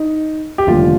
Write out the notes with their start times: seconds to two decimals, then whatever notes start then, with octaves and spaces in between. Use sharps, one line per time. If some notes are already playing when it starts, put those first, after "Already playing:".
Already playing: D#4
0.58 G4
0.67 F1 D#2 D3 G3 F4